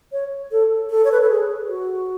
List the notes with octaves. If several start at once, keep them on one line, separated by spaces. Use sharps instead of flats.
C#5
A4
A4
C#5
B4
A4
G#4
F#4